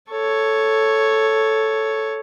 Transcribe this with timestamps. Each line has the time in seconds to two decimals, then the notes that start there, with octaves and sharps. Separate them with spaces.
0.10 A4 C#5